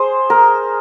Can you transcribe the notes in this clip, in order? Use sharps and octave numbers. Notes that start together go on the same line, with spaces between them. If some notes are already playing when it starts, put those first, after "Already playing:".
Already playing: G#4 C5
A#4